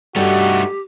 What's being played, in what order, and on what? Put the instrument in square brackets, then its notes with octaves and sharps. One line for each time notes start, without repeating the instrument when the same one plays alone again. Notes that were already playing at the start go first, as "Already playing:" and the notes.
[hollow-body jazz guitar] G2 [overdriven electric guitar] A3 D#4 [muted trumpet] F#4 [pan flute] G4